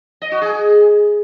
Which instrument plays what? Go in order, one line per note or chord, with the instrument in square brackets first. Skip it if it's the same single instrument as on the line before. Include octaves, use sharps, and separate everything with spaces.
[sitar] D#5
F#4
G#4